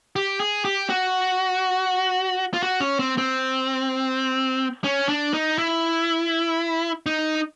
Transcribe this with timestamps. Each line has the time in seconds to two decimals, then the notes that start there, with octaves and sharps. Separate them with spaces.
0.16 G4
0.40 G#4
0.65 G4
0.90 F#4
2.54 F4
2.63 F#4
2.80 C#4
2.99 C4
3.18 C4
4.84 C#4
5.09 D4
5.33 D#4
5.58 E4
7.06 D#4